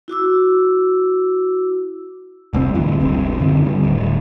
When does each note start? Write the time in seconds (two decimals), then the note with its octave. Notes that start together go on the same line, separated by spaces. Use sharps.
0.08 E4 F#4 D6 E6
2.53 E1 C2 B2 C4
2.74 D1 D2 G2 E3
2.99 F1 C#2 G2 C4
3.40 F#2 D3 C4
3.65 D3 G3
3.83 D1